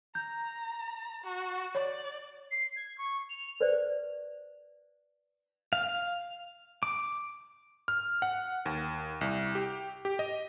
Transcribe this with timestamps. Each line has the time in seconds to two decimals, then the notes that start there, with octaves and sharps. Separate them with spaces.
0.15 A#5 G6
1.24 F#4
1.75 C#5 D5
2.51 C7
2.76 G#6
2.98 C#6
3.30 F7
3.61 B4 C5 D5
5.73 F5
6.83 D6
7.88 F6
8.22 F#5
8.66 D#2
9.21 C2
9.55 G4
10.05 G4
10.19 D#5